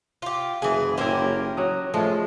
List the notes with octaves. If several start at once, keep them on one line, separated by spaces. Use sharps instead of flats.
F4 G4
F#1 E3 G#4
C#4 E4 G4 A#4 C5
F#3 D#5
F3 G#3 A3 F4